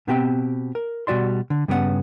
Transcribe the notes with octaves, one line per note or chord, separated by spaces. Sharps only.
B2 B3 C4 G4 G5
A#4
B2 G3 F#4 D5 C6
D3
G2 C#3 B3 G4 F#5